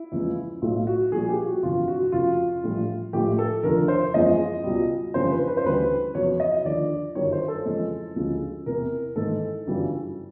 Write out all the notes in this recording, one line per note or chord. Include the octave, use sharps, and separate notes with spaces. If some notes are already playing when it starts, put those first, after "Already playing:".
Already playing: E4
E2 C#3 F3 G#3
B1 A2 F#3 F4
F#4
A#1 A#2 G3 G#4
G4
F#4
G1 F2 C3 E3 F4
F#4
F1 F2 C#3 F4
A#1 A2 E3 G3
A#1 A2 F3 G#3 G4
A4
F1 D#2 D3 F3 A#4
C5
F#1 E2 C#3 F3 G#3 D#5
C#2 B2 G3
G1 F2 C#3 E3 G3 C5
B4
B4
C5
D2 C#3 E3 G3 B4
F1 E2 C#3 F#3 C#5
D#5
D#2 D3 F3 D5
G1 F#2 D#3 G3 C#5
C5
A4
F2 C#3 E3 G#3
D2 C#3 F3 G#3
E1 E2 C3 E3 A#4
G#1 G#2 E3 G#3 A4
G1 F#2 C#3 E3 G3